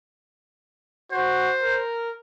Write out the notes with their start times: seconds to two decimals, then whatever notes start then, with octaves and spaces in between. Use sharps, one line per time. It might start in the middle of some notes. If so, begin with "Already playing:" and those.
1.12 F#4 C5
1.63 A#4